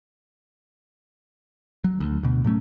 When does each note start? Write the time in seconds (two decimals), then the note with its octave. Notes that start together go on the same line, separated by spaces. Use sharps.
1.84 F#3
2.00 D2
2.23 D2 B2
2.44 A2 F#3 A3 C#4